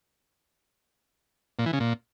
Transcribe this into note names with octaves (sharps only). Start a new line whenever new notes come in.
A#2
E3
C#3
A#2